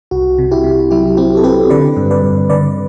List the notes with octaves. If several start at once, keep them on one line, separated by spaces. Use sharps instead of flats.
C2 F#4
C3
E4 G4
C3
F#3 E4 G4
C4 E4 G4
A4
C4 G4 B4
D3 B4 D5
G2
B4 D5
G2
D3 B4 D5